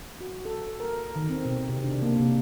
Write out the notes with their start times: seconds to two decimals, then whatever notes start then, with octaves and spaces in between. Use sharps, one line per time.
0.21 F#4
0.45 A4
0.80 A#4
1.16 D#3
1.30 C4
1.45 B2
1.69 C3
1.84 D4
2.02 A#3
2.19 C3